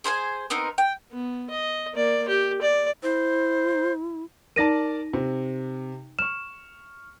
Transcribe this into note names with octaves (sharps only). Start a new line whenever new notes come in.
G#4 C5 F5 G#5
B3 C4 D#4 A#4
G5
B3
D#5
A#3 D5
G4
D5
E4 C5
D#4 A#4 D5 A5 A#6 D#7
C3
C#6 F6 E7